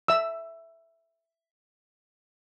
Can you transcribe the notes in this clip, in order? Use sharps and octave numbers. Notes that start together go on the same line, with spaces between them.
E5 E6